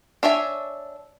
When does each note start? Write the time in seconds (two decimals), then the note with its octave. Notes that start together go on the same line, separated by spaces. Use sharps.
0.23 D4 C#5 E5 G#5